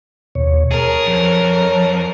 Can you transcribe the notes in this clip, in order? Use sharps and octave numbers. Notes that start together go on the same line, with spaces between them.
D#2 B2 C#5
G#4 A#4 C#5 A5
F2